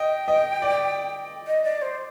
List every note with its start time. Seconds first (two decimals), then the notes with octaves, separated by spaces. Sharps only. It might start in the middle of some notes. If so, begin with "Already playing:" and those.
Already playing: D#5 G5
0.28 D#5
0.62 D5
1.47 D#5
1.64 D5
1.82 C5